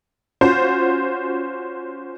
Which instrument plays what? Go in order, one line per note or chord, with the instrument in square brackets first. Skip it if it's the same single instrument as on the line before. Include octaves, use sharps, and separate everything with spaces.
[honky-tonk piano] C#4 F4 F#4 C5